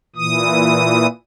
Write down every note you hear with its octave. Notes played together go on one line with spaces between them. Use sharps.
A#2 E3 D#6